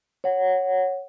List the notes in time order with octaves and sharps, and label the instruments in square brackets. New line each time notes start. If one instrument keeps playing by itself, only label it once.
[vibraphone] C#5 F#5